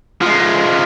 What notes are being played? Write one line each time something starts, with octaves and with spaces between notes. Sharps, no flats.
F3 G#3